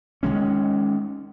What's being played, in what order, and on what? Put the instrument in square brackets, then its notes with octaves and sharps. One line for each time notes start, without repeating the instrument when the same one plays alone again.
[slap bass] D#3 F#3 G#3 C#4